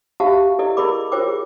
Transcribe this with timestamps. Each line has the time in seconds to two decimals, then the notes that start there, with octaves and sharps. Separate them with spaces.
0.20 F#4 G4 E5 F5 A5
0.59 E4 A4 D5 D#5
0.77 E4 G#4 A#4 D5 B5 D6
1.12 F4 A#4 C5 C#5 G5 D6
1.28 G#4